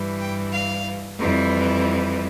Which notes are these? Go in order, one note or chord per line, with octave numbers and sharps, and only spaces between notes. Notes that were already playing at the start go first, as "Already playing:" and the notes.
Already playing: G2 E3 G3
G5
F5
F2 E3 G3